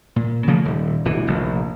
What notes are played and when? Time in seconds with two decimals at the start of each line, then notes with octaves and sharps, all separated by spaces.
0.16 A#2
0.48 C#3 F3 A3 A#3
0.65 D#1
1.05 D1 G1 B2 E3
1.27 F1 A#1